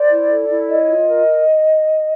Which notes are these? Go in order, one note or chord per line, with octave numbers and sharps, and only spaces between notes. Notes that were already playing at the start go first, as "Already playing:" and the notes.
Already playing: C5 D5
E4
A4
E4
C#5 D#5
F4
A#4